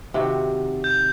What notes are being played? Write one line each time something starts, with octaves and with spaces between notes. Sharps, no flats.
C3 D#3 F#4
G6